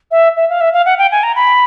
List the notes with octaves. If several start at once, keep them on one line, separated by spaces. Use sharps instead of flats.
E5
E5
F5
E5
F5
F#5
G5
G#5
A#5
B5